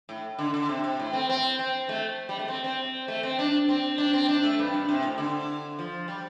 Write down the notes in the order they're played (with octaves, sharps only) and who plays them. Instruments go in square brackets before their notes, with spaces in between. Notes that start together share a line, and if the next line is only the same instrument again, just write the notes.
[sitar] A2
D3
D3
C3
C3
A2
C4
C4
C4
A3
G3
A3
C4
C4
A3
C4
D4
C4
D4
C4
D4
A3
G2
G2
C3
A2
D3
F3
G3